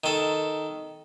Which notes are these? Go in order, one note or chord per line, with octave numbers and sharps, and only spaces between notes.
D#3 A4